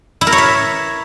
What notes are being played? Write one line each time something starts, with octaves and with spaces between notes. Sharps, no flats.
E4
A#4
C#5
E5